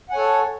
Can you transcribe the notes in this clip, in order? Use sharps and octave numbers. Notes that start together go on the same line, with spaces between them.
A4 C#5 F#5 G#5